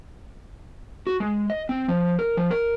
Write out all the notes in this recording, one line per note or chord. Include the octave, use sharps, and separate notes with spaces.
F#4
G#3
D#5
C4
F3
A#4
F3
A#4